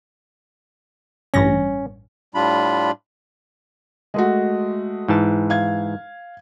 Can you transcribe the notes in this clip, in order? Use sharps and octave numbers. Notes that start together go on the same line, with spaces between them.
A1 G2 C#4 A#6
A2 G3 D4 F4 B5
G#3 A3 F#4
G#2 E3 A5
F5 G#6